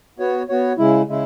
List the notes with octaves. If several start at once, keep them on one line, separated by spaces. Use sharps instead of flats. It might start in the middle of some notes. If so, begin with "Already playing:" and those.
B3 F#4 C#5
B3 F#4 C#5
C#3 G#3 E4
C#3 G#3 E4